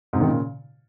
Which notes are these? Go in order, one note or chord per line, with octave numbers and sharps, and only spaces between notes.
G#2 C3
D#3
A#2 C#3